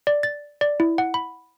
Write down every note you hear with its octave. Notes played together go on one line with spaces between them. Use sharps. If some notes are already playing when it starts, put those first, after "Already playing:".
D5
A6
D5
E4
F#5
B5